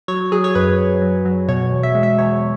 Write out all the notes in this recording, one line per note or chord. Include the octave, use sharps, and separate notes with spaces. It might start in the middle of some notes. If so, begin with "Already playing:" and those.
F#3 C#5
F#3 G#4
C#5
F#2 B4
F#2
F#3
F#3
B2 C#5
E2
E5
G#3
E5
E2 C#5